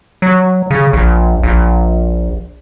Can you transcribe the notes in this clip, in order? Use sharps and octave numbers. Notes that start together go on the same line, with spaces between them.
F#3
C#3
A#1
A#1